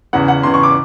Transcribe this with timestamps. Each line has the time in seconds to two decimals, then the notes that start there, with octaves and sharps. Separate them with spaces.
0.13 E2 C#3 E3 F#5
0.28 F#5
0.43 E2 C#3 E3 C6
0.54 C#6
0.63 D6